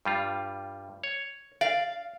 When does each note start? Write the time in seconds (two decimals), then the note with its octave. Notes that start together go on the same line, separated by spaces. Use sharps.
0.05 G2 G3 F4
1.04 C#5
1.61 D5 F5